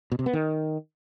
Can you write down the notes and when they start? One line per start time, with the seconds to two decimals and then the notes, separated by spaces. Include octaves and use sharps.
0.12 B2
0.19 C3
0.26 B3
0.33 D#3